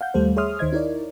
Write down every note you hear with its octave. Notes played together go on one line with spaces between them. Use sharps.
F5 F#5 G6
D#2 G3 A3 A4 C5
G#4 C#5 E5 C6 D#6 F6
D#2 D#3 C5 D#5 G#6
D#4 E4 A#4 C#5 D5